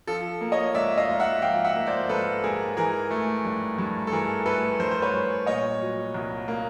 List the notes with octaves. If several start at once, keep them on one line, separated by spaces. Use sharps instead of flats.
F3 A4
A#3
C#5 D#5
G#2 D5 E5
D#5 F5
G#2
E5 F#5
F3 F5 G5
E5 F#5
A#3
C5 D5
G#2 A4 B4
G#2 G#4 A#4
E3 G#4 A#4
A3
G2
G2
A4
E3 G#4 A#4
A3 A4 B4
G2 A#4 C5
C5
B4 C#5
G2
A#2 C#5 D#5
F#3
C2
A#3